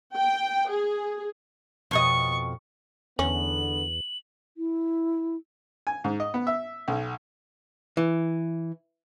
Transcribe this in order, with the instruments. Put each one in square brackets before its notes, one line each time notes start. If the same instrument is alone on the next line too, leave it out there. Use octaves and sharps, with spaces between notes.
[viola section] G5
G#4
[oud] F2 B2 D#5 [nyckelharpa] C#6
[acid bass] E2 [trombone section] D3 B3 [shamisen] C#4 [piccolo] F#7
[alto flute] E4
[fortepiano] G#5
G#2
D#5
B3
E5
B1
[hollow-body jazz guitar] E3